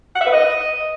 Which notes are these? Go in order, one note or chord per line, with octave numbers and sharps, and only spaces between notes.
F#5
E5
B4
D#5